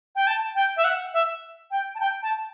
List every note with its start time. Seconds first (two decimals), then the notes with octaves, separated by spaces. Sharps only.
0.16 G5
0.27 A5
0.55 G5
0.77 E5
0.84 F#5
1.13 E5
1.71 G5
1.95 A5
2.00 G5
2.22 A5